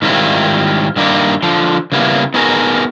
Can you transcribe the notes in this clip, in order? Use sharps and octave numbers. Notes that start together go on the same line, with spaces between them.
G#2 D#3 G3 C4 E4 F4
G2 D#3 A#3 E4 D5
D3 F3
C#3 G3 A#3 B3 E4
B3 D#4 F#4 G#4 A#4